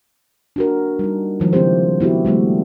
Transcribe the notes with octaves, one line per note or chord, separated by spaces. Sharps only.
D4 F#4 A#4
G3 D#4
D#3 F3 G#3
C#3 C4 E4 G4 C5
B3 E4 F#4 G4
D#3 G3 A3 A#3